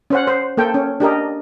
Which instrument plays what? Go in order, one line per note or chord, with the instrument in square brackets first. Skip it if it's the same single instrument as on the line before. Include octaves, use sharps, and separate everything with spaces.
[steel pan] C#4 C5 F#5
C5
A#3 A4 G5
C#4
D4 G4 A#4 D#5